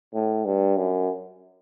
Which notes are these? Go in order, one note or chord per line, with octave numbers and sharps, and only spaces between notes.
A2
G2
F#2